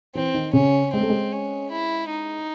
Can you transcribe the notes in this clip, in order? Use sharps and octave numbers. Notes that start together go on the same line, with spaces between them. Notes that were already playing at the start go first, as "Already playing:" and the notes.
E3 C4
D#3
C#3 C#4
G#3 C4
A3
G#3
C#4
E4
D#4